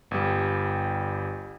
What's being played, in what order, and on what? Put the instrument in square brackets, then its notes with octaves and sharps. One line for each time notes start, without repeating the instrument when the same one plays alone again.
[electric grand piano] G1 G3